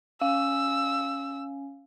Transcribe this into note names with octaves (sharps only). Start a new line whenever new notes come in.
C#4 F5 E6